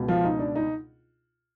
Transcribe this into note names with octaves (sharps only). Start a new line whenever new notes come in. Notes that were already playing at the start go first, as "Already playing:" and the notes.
Already playing: C#2 B2
F3 F4
D#4
D4
D#4